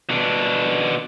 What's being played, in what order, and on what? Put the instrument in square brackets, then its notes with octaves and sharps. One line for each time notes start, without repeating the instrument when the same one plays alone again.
[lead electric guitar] B2 D4